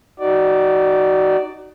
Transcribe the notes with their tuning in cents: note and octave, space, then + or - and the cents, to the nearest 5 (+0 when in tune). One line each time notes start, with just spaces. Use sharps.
D#4 +0 F#4 +25 D5 +0